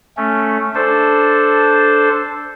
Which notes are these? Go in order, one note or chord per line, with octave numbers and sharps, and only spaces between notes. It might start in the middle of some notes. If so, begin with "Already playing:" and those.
A3 C#4
D4 A4 C5